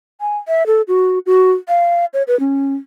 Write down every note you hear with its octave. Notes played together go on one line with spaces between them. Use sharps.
G#5
E5
A4
F#4
F#4
F5
C#5
B4
C#4